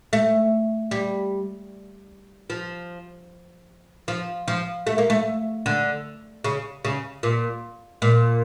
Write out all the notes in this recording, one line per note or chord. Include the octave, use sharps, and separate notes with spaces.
A3
G3
F3
F3
F3
A3
A#3
A3
D3
C#3
C#3
A#2
A#2